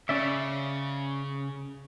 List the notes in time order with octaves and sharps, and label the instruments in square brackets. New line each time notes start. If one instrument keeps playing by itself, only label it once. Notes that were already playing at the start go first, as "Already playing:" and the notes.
[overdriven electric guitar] C#3 [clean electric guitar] C#4 D5 E5